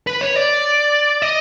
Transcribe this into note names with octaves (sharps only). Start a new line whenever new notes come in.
B4
C#5
D5
D#5